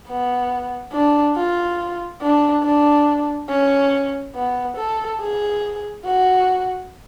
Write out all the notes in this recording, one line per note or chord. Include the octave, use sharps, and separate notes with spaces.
B3
D4
F4
D4
D4
C#4
B3
A4
G#4
F#4